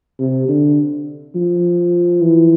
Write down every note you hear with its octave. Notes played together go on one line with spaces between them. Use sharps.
C3
D3
F3
E3